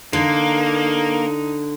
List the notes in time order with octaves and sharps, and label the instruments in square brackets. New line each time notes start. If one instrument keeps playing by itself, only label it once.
[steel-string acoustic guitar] D3 [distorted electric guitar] A#3 [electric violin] D#4